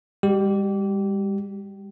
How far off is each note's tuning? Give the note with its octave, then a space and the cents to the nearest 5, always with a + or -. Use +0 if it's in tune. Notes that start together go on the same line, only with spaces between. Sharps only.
G3 +40 G4 -25